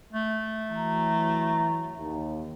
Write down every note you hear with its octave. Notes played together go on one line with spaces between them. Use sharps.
A3
E3 F#3 A#5
D#2